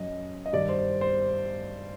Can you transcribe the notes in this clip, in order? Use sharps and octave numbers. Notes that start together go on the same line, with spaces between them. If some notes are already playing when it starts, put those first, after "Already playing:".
Already playing: F#2 F#3 D#5
D#5
G2 D#3 G3 D5
C5
C5